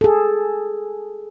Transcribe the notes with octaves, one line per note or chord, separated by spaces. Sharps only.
G#4 A4